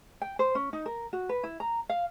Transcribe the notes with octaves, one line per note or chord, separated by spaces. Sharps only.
G5
C5
C#4
D#4
A#4
F#4
B4
E4
A#5
F5